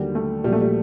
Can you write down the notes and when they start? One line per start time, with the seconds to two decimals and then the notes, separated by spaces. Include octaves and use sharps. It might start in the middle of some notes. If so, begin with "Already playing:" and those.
Already playing: D#2 D3 F#3 G3
0.15 A3
0.44 A#1 A#2 F#3 G3
0.52 A3
0.61 G3